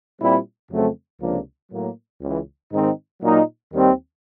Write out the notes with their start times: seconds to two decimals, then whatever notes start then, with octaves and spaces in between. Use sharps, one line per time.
0.20 A#2 G3 C4 E4
0.70 F2 C#3 F#3 A3 C4
1.21 C#2 C3 F3 A#3 D4
1.72 A2 F#3 A#3
2.21 C#2 C#3 E3
2.72 G#2 D#3 G#3 C4 D#4
3.22 A#2 F#3 A#3 D#4
3.73 D#2 D#3 G3 C4